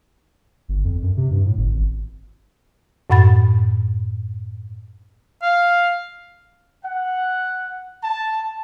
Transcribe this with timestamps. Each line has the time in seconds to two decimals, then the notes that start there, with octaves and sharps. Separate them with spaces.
0.69 G1
0.84 F2
1.02 F#2
1.17 C3
1.31 G2
1.46 A2
1.58 G1
1.71 G#1
3.10 F#2 A2 F#5 B5 A6
5.42 F5
6.84 F#5
8.03 A5